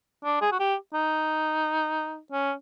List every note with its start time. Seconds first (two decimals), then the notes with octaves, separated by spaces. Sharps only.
0.24 D4
0.41 G#4
0.52 F#4
0.59 G4
0.94 D#4
2.32 C#4